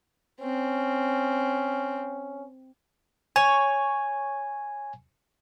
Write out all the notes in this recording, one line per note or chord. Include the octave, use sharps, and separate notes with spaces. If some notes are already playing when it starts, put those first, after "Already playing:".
C4 C#4
C#5 G#5